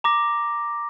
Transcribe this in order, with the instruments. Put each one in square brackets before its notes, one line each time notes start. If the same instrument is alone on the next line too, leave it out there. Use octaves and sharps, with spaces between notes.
[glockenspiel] A#5 D6 A#6